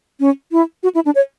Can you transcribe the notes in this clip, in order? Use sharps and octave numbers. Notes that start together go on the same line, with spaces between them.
C#4
E4
F#4
E4
D4
C#5